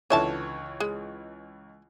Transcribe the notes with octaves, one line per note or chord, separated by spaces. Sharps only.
C#2 D3 E3 C#5 E5 A5
G#3